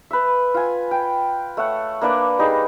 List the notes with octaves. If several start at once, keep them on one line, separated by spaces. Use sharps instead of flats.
B4 E5
F4 G#5
G5
A3 C#5 F#5
A#3 D4 B4 D5
G3 D#4 G#4